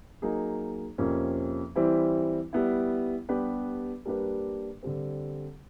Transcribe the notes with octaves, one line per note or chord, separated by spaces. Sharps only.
F#3 A#3 D#4 G#4
F2 C3 F3 A#3 C#4
E3 G3 C4 E4
G3 B3 E4
G3 B3 D4 G4 B4
G3 A#3 D4 G4 B4
D3 G3 C4